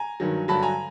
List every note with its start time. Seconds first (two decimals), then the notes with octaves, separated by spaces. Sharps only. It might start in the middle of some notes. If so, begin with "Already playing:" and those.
Already playing: G#5 A#5
0.20 G2 D#3 F#3
0.48 G2 D3 F#3 A5 B5
0.62 G#5 A#5